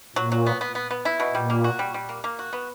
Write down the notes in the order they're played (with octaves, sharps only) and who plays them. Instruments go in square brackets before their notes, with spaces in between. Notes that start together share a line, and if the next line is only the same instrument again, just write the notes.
[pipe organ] A#2 [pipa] F#3
[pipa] F#3
B3
B3
B3
B3
E4
B2
[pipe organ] A#2 [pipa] G3
[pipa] A#3
F#4
G3
G3
A#3
A#3
F#4
B3